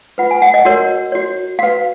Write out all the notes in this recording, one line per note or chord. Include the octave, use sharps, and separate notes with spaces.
F4 B4 F#5
G#5
F#5
D#5
F#4 A#4 C#5
F#4 C#5
F#4 B4 F5